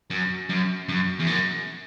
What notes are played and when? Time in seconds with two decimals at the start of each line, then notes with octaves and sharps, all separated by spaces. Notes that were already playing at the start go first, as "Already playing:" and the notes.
0.11 F#2
0.50 F#2
0.89 F#2
1.20 E2
1.27 F#2